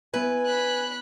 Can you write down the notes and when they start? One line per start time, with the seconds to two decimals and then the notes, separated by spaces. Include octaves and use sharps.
0.14 B3 E4 B4 G#5
0.46 B5 F#6